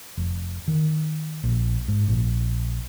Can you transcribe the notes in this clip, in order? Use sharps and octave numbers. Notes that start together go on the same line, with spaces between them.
F1
D#3
A#1
G#2
A#1